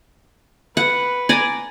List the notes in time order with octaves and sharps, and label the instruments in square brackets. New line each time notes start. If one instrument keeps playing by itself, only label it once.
[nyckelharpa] B4 [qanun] F#5
[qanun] D5 G#5 A#5